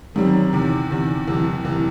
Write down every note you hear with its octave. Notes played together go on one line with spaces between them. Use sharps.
G#1 F#2 D#3 G3 C4
E2 C3 D#3
E2 C3 D#3
F#1 E2 C3 E3
F#1 E2 C3 E3